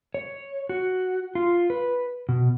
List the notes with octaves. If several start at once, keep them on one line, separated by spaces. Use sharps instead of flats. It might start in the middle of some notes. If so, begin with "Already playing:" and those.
C#5
F#4
F4
B4
B2